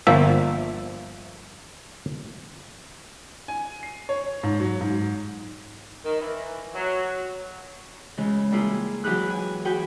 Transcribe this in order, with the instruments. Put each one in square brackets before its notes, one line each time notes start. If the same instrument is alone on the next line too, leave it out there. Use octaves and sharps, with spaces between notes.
[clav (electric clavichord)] G1 F3 A#3 E5
[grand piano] G#5
C7
C#5
G#2
F#3
G#2
[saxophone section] D#3
E3
F#3
[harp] C#3 E3 G#3
G3 A#3 E4 F4 G#4
E3 F#3 G4 G#4 B4 F#6
G#5
F#4 G#4 B4 G5